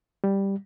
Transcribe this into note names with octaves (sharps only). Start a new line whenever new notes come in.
G3